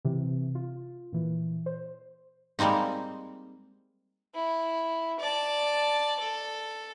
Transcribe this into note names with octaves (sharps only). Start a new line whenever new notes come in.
C3 E3
F4
A#2 E3
C5
G3 G#3 A#3 C4 D#4
E4
D5 A5
A4